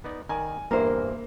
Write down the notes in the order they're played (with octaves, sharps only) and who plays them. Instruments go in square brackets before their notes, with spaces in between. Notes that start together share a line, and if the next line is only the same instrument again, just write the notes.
[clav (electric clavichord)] B3 D#4 D5
[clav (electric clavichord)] D#3 A#4 D5 [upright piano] G#5
[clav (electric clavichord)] E2 G2 [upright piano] A#3 E5 [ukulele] A#4 C5